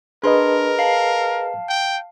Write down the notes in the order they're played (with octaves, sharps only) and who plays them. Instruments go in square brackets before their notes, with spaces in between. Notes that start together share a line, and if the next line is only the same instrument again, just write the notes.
[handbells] D4 C6 [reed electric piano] G#4 B4 D#5 [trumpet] A#4
[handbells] F5 A5 C7
[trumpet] G5